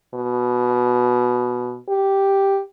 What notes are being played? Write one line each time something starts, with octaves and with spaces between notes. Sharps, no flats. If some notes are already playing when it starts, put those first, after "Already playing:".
B2
G4